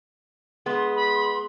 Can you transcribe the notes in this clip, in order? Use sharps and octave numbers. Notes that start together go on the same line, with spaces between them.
G#3 B3 C6
B5